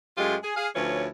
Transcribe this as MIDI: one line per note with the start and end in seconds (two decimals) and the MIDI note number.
0.17 0.36 42
0.17 0.36 56
0.17 0.36 57
0.17 0.36 65
0.17 0.36 67
0.43 0.51 68
0.56 0.68 68
0.56 0.68 77
0.74 1.06 38
0.74 1.06 53
0.74 1.06 61
0.74 1.06 64
0.74 1.06 71
0.74 1.06 73